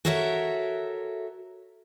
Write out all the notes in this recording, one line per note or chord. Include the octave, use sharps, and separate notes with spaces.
F#4 A4 A#4 C#5 D#5 E5